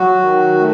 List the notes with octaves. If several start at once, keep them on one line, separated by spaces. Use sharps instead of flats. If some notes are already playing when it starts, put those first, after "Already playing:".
Already playing: F#3 F#4
D#3
A3